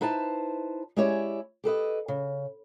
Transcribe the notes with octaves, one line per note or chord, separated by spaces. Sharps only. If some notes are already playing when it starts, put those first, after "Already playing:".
D#4 E4 B4 C5 A5
G#3 C#4 E4 G4 C#5 D5
G4 A4 B4 D#5
C#3